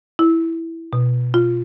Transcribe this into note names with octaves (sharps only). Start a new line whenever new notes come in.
E4
B2
F4